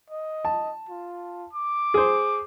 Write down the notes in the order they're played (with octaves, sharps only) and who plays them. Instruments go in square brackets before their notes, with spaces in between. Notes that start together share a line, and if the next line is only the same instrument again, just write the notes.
[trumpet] D#5
[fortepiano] A5
[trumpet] F4
D6
[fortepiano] G#4 C5